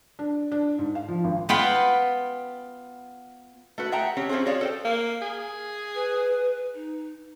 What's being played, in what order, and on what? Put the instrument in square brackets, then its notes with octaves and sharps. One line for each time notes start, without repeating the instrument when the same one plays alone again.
[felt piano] D4
D4
G#2
F5
F3
G#1
[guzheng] B3 F4 G5 B5
[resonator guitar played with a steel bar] A3 F#4 B4
G#4 E5 F#5 G5 A5 A#5
C4 C#4 G4 C#5
C4 C#4 F4 G#4 C5
F#4 G#4 C#5 D5 F5
A4 C5 G5
[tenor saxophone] A#3
G#4
[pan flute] B4
D#4